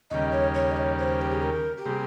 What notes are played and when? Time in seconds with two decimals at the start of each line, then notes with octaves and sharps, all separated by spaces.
0.10 D#2 C#3 G3 A#3 D#5
0.32 C#5
0.54 C#5
0.71 D#5
0.76 C#5
0.98 C5
1.21 G4
1.32 G#4
1.42 A#4
1.77 G4
1.86 C3 G3 A#3 G#4